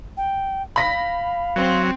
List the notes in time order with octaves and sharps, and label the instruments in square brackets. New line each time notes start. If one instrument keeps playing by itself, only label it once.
[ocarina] G5
[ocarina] F5 [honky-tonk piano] B5 A#6 B6
[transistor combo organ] F#3 [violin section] C4